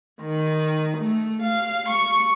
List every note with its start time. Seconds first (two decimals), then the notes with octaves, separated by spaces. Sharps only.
0.21 D#3
0.97 A3
1.43 F5
1.90 C#6